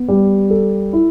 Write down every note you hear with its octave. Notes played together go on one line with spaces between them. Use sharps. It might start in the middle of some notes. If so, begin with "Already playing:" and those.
Already playing: B3
G3
A4
E4